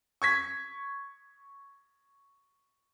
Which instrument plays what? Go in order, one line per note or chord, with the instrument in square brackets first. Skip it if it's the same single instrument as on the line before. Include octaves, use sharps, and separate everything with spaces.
[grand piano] C#6 G#6 B6